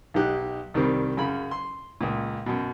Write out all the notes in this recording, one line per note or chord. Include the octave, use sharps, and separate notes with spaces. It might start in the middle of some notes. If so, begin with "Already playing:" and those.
B1 D#4 G4 F#6
C2 D#3 G3 C4
F#2 C#3 B5
C6
C#2 A#2
F#2 B2